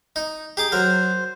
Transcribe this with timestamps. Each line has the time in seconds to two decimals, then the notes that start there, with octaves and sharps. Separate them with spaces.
0.16 D#4
0.57 D#4 G4 G#4 D6
0.72 F#3 A#4 C5